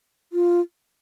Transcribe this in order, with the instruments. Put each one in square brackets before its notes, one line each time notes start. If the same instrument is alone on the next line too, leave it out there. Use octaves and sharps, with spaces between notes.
[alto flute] F4